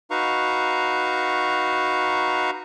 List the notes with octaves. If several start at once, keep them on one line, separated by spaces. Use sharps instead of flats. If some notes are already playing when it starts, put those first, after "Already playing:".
D#4 F#4 B4 F5 A#5 C#6